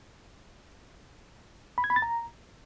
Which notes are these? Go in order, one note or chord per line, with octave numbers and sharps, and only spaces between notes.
B5
G#6
B5
A6
A#5